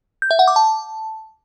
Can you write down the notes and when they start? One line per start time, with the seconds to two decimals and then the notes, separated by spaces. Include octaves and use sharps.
0.22 G6
0.31 E5
0.39 F#5
0.48 D6
0.56 A5